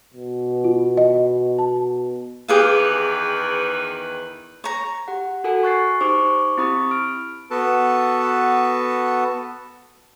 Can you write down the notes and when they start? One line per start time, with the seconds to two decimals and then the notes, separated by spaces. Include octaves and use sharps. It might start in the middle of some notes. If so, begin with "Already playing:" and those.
0.14 B2
0.64 F4
0.97 D#5
1.59 A5
2.48 E2 D#3 G4 G#4 B4 F5
4.64 C#5 A#5
5.08 G4 F#5
5.44 F#4 A4 A#4 F#5 G#5
5.63 C#6 F#6 A6 C7
6.01 D#4 G4 C5 C#6 D6
6.58 C4 E4 G4 B5 C#6 D#6
6.91 F6 D7
7.51 B3 F#4 A4 B4 A5